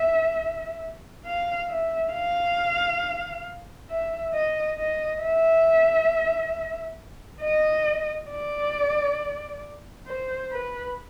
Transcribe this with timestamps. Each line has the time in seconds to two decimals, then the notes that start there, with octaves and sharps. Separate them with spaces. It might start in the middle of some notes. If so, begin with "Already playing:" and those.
Already playing: E5
1.26 F5
1.69 E5
2.13 F5
3.90 E5
4.33 D#5
4.78 D#5
5.22 E5
7.42 D#5
8.31 D5
10.07 C5
10.51 B4